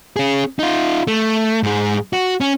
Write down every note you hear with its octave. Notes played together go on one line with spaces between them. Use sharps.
C#4 G#4
D#4 F4
A3
G#2 G#4
F#4
C#4